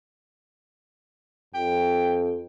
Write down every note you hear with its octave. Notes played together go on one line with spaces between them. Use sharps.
F2 G5